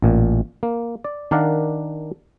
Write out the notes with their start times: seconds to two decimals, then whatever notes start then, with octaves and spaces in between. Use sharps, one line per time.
0.02 A1 A#2
0.63 A#3
1.04 D5
1.31 D#3 D4 A#4 D5 F5 F#5